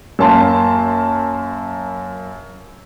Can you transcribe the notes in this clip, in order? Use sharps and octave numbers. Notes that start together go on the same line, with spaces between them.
F#2 A#3 A5 C6